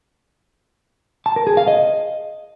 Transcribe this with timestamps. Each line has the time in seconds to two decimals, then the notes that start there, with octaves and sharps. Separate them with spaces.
1.26 A5
1.36 A#4
1.47 G#4
1.57 F5
1.68 D#5